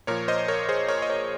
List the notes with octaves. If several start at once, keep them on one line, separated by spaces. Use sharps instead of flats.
A#2 F3 A#4 C#5
C5 D#5
A#4 C#5
G#4 C5
A#4 C#5
D#5
A#4 C#5